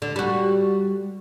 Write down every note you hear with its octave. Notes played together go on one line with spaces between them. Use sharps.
D3
G3 F#4